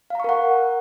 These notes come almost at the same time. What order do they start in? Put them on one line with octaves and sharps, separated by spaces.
F5 A#5 C#6 A#4 F#5